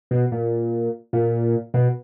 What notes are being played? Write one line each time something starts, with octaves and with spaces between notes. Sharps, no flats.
B2
A#2
A#2
B2